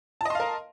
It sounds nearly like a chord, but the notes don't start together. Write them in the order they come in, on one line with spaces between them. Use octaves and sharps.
A5 D#5 C6 F5 A#4